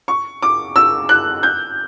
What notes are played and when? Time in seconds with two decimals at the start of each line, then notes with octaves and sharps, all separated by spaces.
0.08 C#6
0.42 D6
0.76 E6
1.09 F#6
1.43 G6